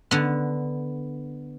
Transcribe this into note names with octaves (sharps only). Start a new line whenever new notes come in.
D3 B3